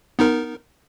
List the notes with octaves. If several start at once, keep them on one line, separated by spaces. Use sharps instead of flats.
B3 D#4 A#4